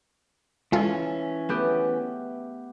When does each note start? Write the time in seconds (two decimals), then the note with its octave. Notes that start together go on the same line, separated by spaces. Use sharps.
0.72 E3 G#3 C#4 F4 A4
1.49 A3 B3 G4